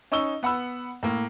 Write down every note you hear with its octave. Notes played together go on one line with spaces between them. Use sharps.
C#4 D#4 C#6 E6 G7
B3 F#5 B5 E6
A2 A#3